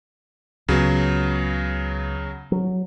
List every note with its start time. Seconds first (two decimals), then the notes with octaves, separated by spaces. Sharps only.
0.68 C#2 C#3 F#3 B3
2.52 F#3